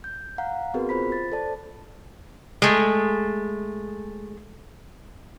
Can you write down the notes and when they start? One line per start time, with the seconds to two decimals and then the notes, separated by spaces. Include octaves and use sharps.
0.04 G6
0.38 F5 F#5 A#5
0.74 B3 C4 F#4 G#4 A#4 B4
0.89 F4 C5 B5 B6
1.12 A6
1.32 A4 C5 D5 A5
2.62 G#3 A3